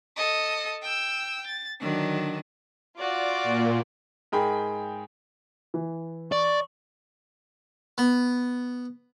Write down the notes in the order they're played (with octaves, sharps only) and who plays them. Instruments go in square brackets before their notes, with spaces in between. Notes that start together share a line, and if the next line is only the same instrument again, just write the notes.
[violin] A4 D#5
G5 E6
A6
[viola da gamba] D3 D#3 F#3 [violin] D4
[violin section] F4 F#4 D5
[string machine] A#2
[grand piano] G#2 G#4 A#4 G5 B5
E3
[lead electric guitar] D5 [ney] C#6
[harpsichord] B3